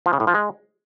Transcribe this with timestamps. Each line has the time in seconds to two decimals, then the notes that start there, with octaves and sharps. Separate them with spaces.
0.06 F3
0.13 C#3
0.20 A2
0.27 F3
0.34 G#3